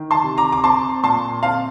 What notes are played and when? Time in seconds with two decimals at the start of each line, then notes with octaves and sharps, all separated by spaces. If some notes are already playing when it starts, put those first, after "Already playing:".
Already playing: D#3
0.11 A5 C6
0.24 C3
0.38 A#5 D6
0.52 D6
0.64 C4 A5 C6
1.04 A#2 A5 C6
1.43 C4 F5 A5